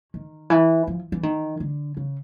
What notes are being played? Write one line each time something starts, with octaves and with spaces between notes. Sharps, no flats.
D#3
E3
F3
E3
D#3
D3
C#3